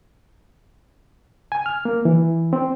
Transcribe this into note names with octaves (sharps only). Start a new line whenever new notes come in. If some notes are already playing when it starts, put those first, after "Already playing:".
G#5
F6
A#3
E3
C4